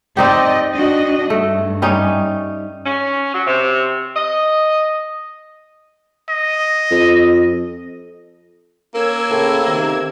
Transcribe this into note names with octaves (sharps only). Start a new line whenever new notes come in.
C4 D#4 G4 D5 D#5
D4 F#4 D#5
G2 A3
G3 C#4 D#4
C#4
F#3
C3
D#5
D#5
F2
A#3 C#4 A4 A#4 E6 G#6
A2 C#3
C3 D#3